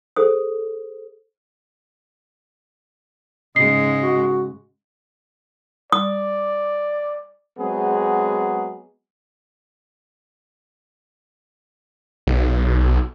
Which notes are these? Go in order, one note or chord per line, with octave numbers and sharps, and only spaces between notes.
G#4 A4 C5 D#6
G#2 C#3 G#3 D#5 C7
F#4
D5 D#6
F#3 G#3 B3 C4 G#4
B1